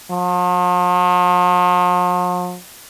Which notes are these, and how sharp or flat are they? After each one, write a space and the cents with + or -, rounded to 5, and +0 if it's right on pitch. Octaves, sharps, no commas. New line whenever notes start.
F3 +45